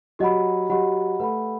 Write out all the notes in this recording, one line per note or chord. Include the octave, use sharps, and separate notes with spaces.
F#3 G4 D#5 F#5 B5
F#3 G4 D#5 F#5 B5
A3 B4 F#5 B5